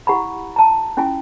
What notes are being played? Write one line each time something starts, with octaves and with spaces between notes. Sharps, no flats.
E4 G4 F#5 A#5 B5
A5 A#5
C#4 E4 F4 G#5